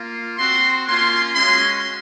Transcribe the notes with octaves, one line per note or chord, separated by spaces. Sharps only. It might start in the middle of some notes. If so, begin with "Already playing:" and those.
Already playing: A#3 F4
C4 F#4 C6
A#3 C#4 F4 C6
G#3 C#4 F#4 C6